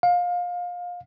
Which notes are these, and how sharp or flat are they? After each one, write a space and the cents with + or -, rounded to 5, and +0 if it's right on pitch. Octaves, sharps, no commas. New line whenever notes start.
F5 +25